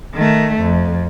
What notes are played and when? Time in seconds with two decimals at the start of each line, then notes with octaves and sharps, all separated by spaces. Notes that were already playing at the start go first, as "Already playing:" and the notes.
0.15 D#3 A3
0.60 F2